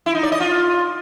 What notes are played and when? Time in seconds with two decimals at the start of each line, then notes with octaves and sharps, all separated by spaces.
0.06 E4
0.15 D#4
0.23 D5
0.32 D#5
0.40 F4